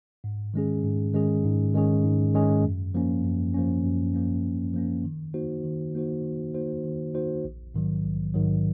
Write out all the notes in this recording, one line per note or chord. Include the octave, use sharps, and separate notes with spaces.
G#2
D#3 G#3 C#4 G#4
G#2
D#3 G#3 C#4 G#4
G#2
D#3 G#3 C#4 G#4
G#2
D#3 G#3 C#4 G#4
F#2
F3 A#3 C#4
F#2
F3 A#3 C#4
F#2
F3 A#3 C#4
F#2
F3 A#3 C#4
D#3
A#3 D#4 F#4 C5
D#3
A#3 D#4 F#4 C5
D#3
A#3 D#4 F#4 C5
D#3
A#3 D#4 F#4 C5
A#1
G#2 D#3 F#3
A#1
G#2 D#3 F#3